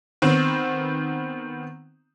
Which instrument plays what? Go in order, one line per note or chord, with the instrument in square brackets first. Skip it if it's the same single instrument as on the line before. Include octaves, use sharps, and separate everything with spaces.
[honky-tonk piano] D#3 B3 C4